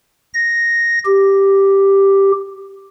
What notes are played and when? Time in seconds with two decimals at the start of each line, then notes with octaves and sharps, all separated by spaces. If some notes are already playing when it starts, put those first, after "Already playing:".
0.34 A#6
1.05 G4